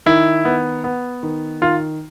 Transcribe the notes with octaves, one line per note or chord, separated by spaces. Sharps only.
D#3 E4
B3
B3
D#3
D#3 F4